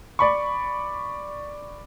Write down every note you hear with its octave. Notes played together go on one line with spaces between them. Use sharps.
D5 B5 C#6